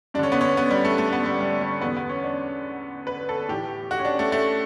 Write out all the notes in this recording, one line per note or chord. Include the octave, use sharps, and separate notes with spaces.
G2 D3 C#4 D4
B3
C#4
B3
G3
A3
A3
B3
G3
G3
G3
E2 D3 B3
B3
C#4
D4
B4
A4
A2 E3 G4
F#4
C#4
D4
A3
A3